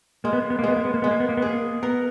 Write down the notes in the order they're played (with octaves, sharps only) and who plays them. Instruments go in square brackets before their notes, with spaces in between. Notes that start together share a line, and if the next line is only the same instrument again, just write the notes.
[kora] G#3 [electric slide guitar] A#3
[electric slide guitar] B3
A#3
B3
A#3
[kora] G#3 [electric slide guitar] B3
[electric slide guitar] A#3
B3
A#3
[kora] G#3 [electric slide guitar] B3
[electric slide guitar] A#3
B3
A#3
B3
[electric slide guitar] A#3 [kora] G#4
[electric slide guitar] B3 [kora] A#4